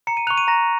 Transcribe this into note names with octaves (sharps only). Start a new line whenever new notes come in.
A#5 C#7
D#7
C#6 F#6 F7
D#7
A#5 A#6